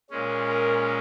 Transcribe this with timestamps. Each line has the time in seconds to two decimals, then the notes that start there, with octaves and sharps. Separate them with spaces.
0.11 A#2 G#3 C#4
0.48 A#4